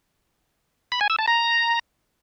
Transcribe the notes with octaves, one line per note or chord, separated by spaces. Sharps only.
B5
G#5
E6
A5
A#5